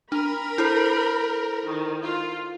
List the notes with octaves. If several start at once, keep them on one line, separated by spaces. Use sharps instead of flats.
D4 A#4 B5
E4 A4 C5
D#3
F4